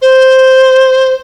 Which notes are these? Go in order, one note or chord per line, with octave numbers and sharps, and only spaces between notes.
C5